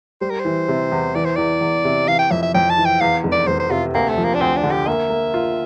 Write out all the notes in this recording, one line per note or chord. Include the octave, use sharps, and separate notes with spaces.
G3 C5
A#4
C5
E3
C3
E2
E3 D5
C5
E2 D5
E2
C3
E3 F5
G5
F2 E5
E5
F2 G5
A5
E3
G5
E2 F5
F1
D5
F1 C5
C5
C3 F4
D2 A#3
A3
F3
A#3
D4
D2 C4
D4
D3
G4
A#3 E5
A#3
F4